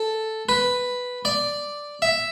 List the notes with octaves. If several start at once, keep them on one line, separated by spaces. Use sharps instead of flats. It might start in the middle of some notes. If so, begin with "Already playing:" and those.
Already playing: A4
B4
D5
E5